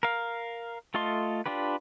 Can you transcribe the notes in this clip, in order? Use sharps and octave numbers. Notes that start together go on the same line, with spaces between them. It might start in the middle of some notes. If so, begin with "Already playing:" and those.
A#4 F5
A3 F4 A4 D#5 C6
D4 F4 G4 B4